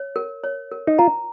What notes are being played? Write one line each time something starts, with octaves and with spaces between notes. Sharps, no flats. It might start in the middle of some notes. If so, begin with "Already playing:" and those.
Already playing: C#5
A#4
C#5
A#4
D#4
F4 A#5